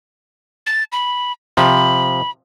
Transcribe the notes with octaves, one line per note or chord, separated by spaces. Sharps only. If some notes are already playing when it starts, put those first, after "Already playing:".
A6
B5
C3 F3 B5